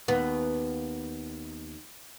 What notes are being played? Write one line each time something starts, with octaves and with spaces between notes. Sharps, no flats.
D#2 B3